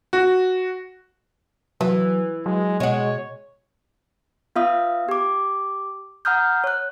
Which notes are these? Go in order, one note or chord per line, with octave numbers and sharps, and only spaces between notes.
F#4
E3 F#3
F#3 G#3
B2 G#3 F#4 C#5
B3 F4 E5 F5 D#6
G4 D6
F#5 A#5 D#6 F6 G6
C#5 F#6